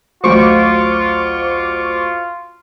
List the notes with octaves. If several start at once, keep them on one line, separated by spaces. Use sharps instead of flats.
A1 D2 F#3 F4 C5 C#6 D6